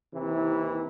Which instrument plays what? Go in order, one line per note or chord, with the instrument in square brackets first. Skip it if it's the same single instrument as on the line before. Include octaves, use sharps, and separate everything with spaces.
[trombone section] D#2 C3 E3 E4